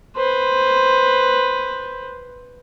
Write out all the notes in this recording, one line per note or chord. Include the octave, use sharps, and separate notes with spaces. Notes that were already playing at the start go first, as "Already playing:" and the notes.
B4 C5